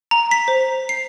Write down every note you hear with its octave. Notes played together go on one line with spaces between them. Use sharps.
A#5
B6
C5
C7